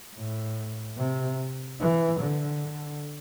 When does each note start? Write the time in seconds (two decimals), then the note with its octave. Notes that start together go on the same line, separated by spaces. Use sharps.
0.15 A2
0.97 C3
1.80 E3
2.21 D3
2.62 D3